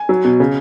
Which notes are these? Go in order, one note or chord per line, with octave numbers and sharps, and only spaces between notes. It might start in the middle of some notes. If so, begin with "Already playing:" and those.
Already playing: G#5
F#3
B2
C#3